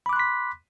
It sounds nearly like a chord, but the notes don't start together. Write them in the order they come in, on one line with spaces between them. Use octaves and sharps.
B5 D6 F#6 C6 B6